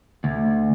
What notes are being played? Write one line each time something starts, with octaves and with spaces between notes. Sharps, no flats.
D2